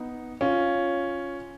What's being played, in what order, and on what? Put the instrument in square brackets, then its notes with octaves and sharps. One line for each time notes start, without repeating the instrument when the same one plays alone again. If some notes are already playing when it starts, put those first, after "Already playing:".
Already playing: [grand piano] B3 D#4
C#4 F4